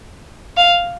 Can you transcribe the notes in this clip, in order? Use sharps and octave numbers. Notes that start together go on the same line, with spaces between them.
F5